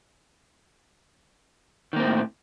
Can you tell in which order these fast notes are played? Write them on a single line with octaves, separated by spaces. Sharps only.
D#3 A#3 C4 A2